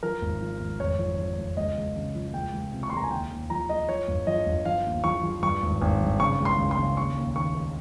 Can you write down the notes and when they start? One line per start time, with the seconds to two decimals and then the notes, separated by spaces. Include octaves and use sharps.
0.03 F3 A#4
0.22 G#1
0.41 F3
0.60 G#1
0.80 F1 C#5
0.99 F3
1.18 F3
1.38 F1
1.57 C#2 D#5
1.76 C#2
1.96 C#3
2.15 F3
2.34 C#2 G5
2.53 C#2
2.72 C3
2.83 C#6
2.90 C6
2.92 C#2 A#5
3.04 G#5
3.11 D#2 G5
3.31 D#2
3.50 F3 A#5
3.69 F3 D#5
3.88 F3 C#5
4.08 G1
4.27 F3 D#5
4.46 G1
4.65 F3 F5
4.85 D#2
5.04 F3 C#6
5.23 F3
5.43 G2 C#6
5.62 G#1
5.82 G#1
6.01 G2
6.20 C#3 C#6
6.39 C#2
6.45 C6
6.58 C#2
6.71 C6
6.78 C#3
6.97 D#2 C#6
7.17 D#2
7.36 D#3 C#6
7.55 D#3